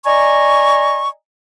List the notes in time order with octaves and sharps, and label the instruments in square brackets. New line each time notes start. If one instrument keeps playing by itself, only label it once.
[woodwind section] D5 D#5 G#5 A#5 C#6